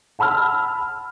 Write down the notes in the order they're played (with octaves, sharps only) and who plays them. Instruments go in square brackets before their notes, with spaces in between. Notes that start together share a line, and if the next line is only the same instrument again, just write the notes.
[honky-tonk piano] F#5 A5 B5 E6 F6